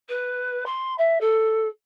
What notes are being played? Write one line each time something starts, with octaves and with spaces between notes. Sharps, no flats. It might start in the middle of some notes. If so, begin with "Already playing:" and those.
B4
C6
E5
A4